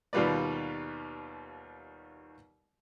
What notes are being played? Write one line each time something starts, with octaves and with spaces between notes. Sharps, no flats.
D#2 B2 G3 F4 B4 D5